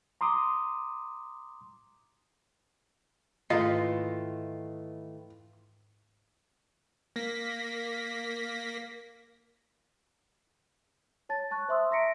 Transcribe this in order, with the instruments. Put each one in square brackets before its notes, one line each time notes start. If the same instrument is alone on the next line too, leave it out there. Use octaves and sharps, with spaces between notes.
[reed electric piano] A#5 C6 D6 D#6
[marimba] G#2 A#3 A#6 [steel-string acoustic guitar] D#3 E3 A3 [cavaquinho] F4 [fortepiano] D#5
[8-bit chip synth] A#3 A#6 B6
[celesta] C#5 A5 A6
A5 C#6 F#6
C5 E5 C6 D#6 E6
E5 A#5 A#6 B6 C#7 D7